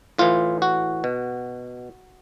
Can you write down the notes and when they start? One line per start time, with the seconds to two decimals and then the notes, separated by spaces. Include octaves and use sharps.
0.18 A2 E3 F4
0.62 F#4
1.04 B2